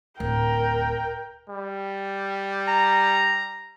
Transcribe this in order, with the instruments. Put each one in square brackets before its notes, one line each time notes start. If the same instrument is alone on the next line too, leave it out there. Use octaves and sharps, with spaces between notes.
[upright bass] D1 [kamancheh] A#4 G5
[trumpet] G3
[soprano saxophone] A#5